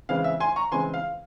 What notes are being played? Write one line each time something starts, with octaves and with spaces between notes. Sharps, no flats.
C#3 E3 G#3 C4 F5
E5
G#5 C6
A#5 C#6
C#3 E3 G#3 C4 G#5 C6
F5